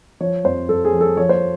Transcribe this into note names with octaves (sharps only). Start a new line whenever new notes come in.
F3 C#5
F2 C5
F2 A4
G#4
F3
A4
F3 C#5
C5